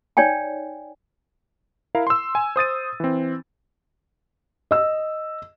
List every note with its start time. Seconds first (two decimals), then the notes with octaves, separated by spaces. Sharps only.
0.17 D#4 C#5 D5 G5 G#5
1.95 E4 A#4 F5
2.07 C6 E6
2.35 G#5
2.56 C5 D#6 A6 D#7
3.00 E3 C4
4.71 D#5 E6